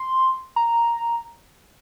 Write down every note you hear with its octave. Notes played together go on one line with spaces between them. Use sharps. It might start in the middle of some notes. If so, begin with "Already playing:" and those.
Already playing: C6
A#5